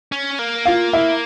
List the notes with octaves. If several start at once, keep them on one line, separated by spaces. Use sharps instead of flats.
C#4
A#3
F4 F5
E4 E5